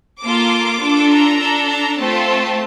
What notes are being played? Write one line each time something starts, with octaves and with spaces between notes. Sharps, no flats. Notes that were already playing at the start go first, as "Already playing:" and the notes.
A#3 F4 A4 D6
D4 F4 A4
A#5
D4 A4
A#5
A3 C4 F4 A4 A5